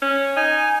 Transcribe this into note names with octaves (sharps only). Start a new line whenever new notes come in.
C#4
D#4 G#5